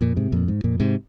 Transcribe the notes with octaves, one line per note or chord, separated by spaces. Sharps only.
F2 A#2
G#2 C3
F2 A#2
G#2
F2 A#2
G#2 C3